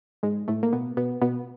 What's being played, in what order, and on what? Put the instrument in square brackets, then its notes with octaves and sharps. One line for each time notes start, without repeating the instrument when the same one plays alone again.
[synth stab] G#2 G#3
A2 A3
A#3
B2 B3
B2 B3
B2 B3